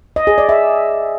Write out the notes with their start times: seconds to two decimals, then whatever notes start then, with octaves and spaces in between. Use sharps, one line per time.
0.16 D#5
0.27 G#4
0.38 D5
0.49 E5